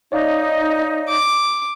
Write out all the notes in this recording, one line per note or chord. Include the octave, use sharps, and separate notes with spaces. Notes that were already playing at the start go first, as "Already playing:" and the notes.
D#4 C#5 D5 F5
D6